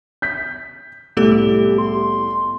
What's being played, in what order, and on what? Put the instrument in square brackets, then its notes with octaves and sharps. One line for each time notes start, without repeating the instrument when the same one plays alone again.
[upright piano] G6 B6
[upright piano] C2 A2 [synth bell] A3 B3 A4 [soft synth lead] G4
[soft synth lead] C6